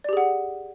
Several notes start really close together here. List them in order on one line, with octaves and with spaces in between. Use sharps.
D5 G4 G#4 F#5